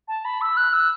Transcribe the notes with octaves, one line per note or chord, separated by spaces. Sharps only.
A5
B5
E6
F#6
E6